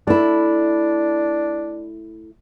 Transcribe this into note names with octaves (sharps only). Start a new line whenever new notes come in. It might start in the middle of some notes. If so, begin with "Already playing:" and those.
A3 D4 E4